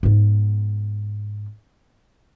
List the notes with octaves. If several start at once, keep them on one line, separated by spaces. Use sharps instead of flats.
G#2 B3